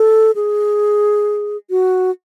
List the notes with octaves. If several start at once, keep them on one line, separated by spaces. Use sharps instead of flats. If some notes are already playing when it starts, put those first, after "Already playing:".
Already playing: A4
G#4
F#4